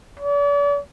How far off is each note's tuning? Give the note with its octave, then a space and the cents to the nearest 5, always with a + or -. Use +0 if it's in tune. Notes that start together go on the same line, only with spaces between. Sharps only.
D5 -40